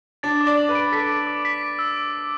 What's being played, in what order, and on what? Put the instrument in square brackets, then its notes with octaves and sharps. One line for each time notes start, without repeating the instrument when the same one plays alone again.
[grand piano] D4 [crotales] A6
[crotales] D6
[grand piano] D5
[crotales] F#7
[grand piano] B4
[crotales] D7
[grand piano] A4 [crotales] B6
[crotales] B6
D6
B6
D7
E6
D7
D7